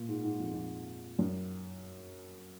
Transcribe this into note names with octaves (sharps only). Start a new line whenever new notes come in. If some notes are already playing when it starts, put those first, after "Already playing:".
Already playing: A#2
G#2
G#2
F2
F2
F#2